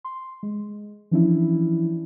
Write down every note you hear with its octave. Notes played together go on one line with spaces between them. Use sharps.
C6
G#3
E3 F3 C#4 D4 E4